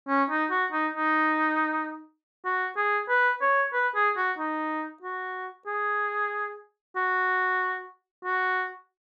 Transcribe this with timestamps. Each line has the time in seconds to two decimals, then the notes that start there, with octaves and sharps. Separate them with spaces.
0.08 C#4
0.30 D#4
0.51 F#4
0.72 D#4
0.94 D#4
2.45 F#4
2.77 G#4
3.09 B4
3.42 C#5
3.73 B4
3.95 G#4
4.17 F#4
4.38 D#4
5.02 F#4
5.67 G#4
6.96 F#4
8.25 F#4